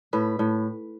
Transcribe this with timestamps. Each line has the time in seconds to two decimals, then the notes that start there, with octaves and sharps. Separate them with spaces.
0.13 A2 B4
0.39 A2